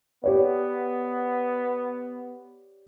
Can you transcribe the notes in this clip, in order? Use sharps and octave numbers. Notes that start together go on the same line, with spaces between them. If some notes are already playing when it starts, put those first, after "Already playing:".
B3 G4 C#5 D5